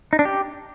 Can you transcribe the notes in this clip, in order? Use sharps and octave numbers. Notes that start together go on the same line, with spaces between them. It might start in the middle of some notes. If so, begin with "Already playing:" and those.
D#4
D4
G4